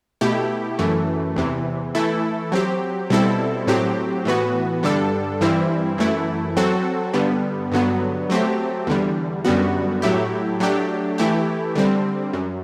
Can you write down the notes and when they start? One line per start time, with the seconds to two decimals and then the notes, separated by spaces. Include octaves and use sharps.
0.21 B2 A3 E4 G4
0.79 F#2 E3 A3
1.36 E2 C3 E3
1.95 E3 A3 E4 A4
2.52 F#3 C4 G4
3.10 B2 G3 C4 E4 A4
3.67 A2 F#3 C4 G4
4.25 A2 E3 B3 F#4
4.83 G2 D3 G3 D4 A4
5.41 G2 E3 G3 C4 E4
5.98 F#2 E3 A3 E4
6.56 F#3 C4 F#4 A4
7.14 G2 D3 G3 B3
7.72 G2 D3 F#3 B3
8.30 F#3 A3 C4 G4
8.87 E2 D3 G3
9.45 F#2 D3 G3 B3 F#4
10.02 A2 F#3 A3 E4 G4
10.60 F#3 A3 D4 G4
11.18 E3 A3 E4 G4
11.75 D3 G3 C4
12.33 F#2